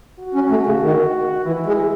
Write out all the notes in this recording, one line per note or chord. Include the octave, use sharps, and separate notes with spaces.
F#4
C#4
A3
C#3
D#3
E3 E4
G#3